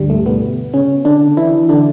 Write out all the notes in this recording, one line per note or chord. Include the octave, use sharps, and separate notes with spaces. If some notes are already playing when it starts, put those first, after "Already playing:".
Already playing: D2 G2 D3 G3
A2 A3
B2 B3
C#3 C#4
D3 D4
E3 E4
D3 D4